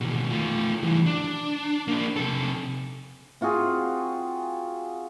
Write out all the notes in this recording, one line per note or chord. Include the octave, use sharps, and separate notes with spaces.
D#2 B2
A3 F4
E3 G3
D4
A#3 D4
C3 A4
C4 F4 F#4 G#4